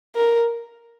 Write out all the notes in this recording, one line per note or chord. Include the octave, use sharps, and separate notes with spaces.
A#4